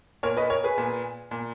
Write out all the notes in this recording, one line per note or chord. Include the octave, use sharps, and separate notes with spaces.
A#2 A#4 C#5
B4 D#5
A#4 C#5
G#4 B4
A#2
A#2